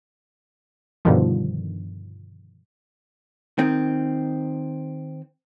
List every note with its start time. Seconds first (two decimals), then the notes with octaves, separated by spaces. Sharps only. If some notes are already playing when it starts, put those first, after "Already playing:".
1.05 G2 B2 D3 D#3 F3
3.58 D#3 C4